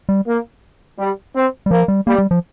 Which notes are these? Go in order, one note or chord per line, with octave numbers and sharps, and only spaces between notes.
G3
A#3
G3
C4
G3
F3 A#3
G3
G3 A#3
G3
F3